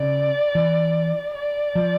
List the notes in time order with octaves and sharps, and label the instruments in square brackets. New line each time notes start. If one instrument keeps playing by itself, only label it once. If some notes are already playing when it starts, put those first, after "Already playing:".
Already playing: [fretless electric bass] C#3 [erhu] D5
[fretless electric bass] E3
[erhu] D5
[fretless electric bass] F3